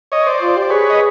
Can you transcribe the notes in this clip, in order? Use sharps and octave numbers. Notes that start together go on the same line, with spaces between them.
C#5 D#5
C5 D5
F4
G4
D5
G#4 B4 C#5
D#5